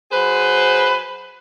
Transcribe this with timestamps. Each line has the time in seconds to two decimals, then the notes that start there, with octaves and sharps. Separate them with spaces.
0.12 F#3 G#4 B4 C5